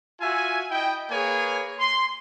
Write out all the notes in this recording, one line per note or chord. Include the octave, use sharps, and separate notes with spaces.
F4 F#4 E5 G#5
E4 D#5 G5
A#3 G#4 B4 C#5 G#5
C6